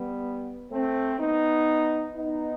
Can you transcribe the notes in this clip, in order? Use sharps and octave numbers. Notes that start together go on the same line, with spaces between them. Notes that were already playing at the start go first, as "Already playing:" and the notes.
Already playing: G3 B3
A3 C4
B3 D#4
B3 D#4